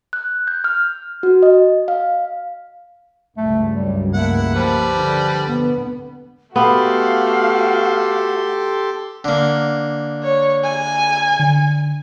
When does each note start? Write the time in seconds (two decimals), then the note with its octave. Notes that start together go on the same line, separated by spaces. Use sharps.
0.13 F#6
0.47 G6
0.64 F6
1.23 F#4
1.43 D#5
1.88 F5
3.37 C#2 G2 A3
3.75 F#2 G3
4.13 A3 A#3 E4 F#5
4.55 F3 G3 B4
4.95 D3
5.48 B3
6.56 A3 B3 F#4 G4 A4 F5 C6
9.24 D3 A#3
10.23 C#5
10.64 G#5
11.40 D3